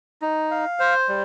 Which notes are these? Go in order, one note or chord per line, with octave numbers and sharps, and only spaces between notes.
D#4
F5
C5
G3